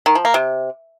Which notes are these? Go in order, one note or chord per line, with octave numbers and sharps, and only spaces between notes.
D#3
F3
A#3
C3